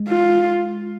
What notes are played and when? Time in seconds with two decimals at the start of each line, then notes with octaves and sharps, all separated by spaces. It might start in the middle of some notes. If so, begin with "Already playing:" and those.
Already playing: G#3
0.09 F4